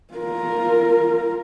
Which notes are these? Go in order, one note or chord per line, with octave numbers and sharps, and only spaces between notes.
F4 A#4